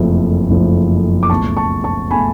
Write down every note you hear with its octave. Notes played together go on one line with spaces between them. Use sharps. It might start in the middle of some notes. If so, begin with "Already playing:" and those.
Already playing: F#1 F2 F3 A3
F#1 F2 F3 A3
D6
C#2 B2 A3 A5 C#6
A5 C#6
A5 C#6
B2 A3 G#5 B5